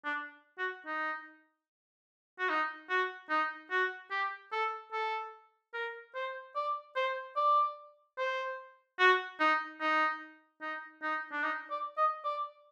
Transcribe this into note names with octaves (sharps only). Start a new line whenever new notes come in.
D4
F#4
D#4
F#4
D#4
F#4
D#4
F#4
G4
A4
A4
A#4
C5
D5
C5
D5
C5
F#4
D#4
D#4
D#4
D#4
D4
D#4
D5
D#5
D5